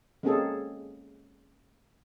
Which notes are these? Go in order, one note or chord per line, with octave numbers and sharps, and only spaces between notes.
G#3 A#3 C4 C#4 G#4 A4